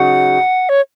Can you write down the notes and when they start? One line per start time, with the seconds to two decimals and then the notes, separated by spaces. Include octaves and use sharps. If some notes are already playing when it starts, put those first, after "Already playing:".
Already playing: C#3 F#3 D#4 F#4 F#5
0.69 C#5